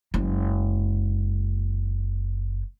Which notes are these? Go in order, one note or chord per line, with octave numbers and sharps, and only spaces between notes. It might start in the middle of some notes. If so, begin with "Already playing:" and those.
F#1 G#3